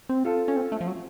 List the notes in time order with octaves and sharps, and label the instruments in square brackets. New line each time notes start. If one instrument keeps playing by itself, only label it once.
[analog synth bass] C4
[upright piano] F4 A4
[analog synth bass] C#4
C4
A3
F3
F#3